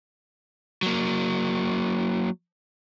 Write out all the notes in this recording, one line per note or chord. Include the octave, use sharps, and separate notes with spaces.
F#3 A#3